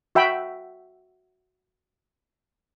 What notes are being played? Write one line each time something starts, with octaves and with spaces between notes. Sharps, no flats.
F#4 E5 G5 B5